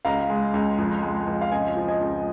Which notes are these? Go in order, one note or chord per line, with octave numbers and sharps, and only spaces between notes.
C#2 F5 A#5
G#3
C#2
F2
G#3
F2
F5
C#2 D#5 G#5
F3
D#5 G#5
C#2